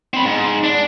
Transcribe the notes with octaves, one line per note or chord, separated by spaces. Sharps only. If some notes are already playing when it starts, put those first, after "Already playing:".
C4 B5
G#2
D4